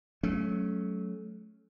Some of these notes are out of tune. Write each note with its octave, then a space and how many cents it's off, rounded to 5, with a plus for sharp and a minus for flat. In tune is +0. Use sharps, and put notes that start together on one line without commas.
F#3 +0 A3 -25 C#4 +0